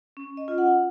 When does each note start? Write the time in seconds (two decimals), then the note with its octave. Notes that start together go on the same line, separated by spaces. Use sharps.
0.17 C#4
0.37 D#5
0.48 F4
0.58 F#5